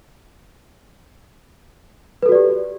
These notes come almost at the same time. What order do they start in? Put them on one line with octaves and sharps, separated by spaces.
B4 A4 F#4 D5 G4